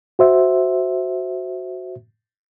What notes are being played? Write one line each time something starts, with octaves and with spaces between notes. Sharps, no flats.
F#4 C5 E5